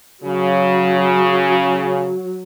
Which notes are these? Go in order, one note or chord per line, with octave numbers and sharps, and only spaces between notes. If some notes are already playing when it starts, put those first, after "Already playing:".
C#3 F#3